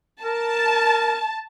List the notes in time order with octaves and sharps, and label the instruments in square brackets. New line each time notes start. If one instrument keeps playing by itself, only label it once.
[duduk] A#4 [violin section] A5